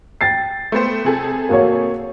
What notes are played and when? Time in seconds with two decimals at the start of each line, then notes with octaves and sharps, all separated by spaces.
0.21 G5 A6 C7
0.72 A3 B3 C5
1.05 C3 G#4 A4
1.49 A#3 F#4 C#5